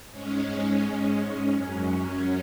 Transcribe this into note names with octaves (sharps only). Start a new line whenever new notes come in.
G#2 G#3 C#4
F#2 F#3 C#4